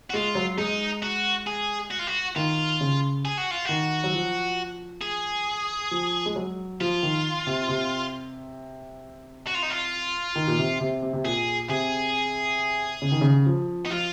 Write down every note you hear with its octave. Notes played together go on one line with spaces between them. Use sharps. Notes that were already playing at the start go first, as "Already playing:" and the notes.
F#4
G#3 F4
F#3
G#3 D#4
F#4
G#4
F#4
F4
F#4
D#3 F4
C#3
G#4
F#4
F4
D#3 F#4
F#3
F3
G#4
F3
G#3
F#3
F3 F4
D#3
C3
C3
F#4
F4
D#4
F4
D#3
A#2
C3
C3
C3
C3
A#2 G#4
C3 G#4
C#3
D#3
C#3
F3
D#4
F3 F4